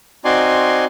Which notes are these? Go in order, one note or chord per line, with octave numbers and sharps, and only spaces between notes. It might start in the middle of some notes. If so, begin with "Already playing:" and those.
C4 D#4 F#4 D5 G#5 C6